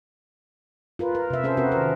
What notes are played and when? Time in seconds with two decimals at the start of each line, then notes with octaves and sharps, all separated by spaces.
0.99 F4 A#4 B4
1.15 A#4
1.30 C3 E5
1.44 C#4 G#4 A4 C5
1.57 C4 F#4 A#4 B4
1.72 D#3 A#4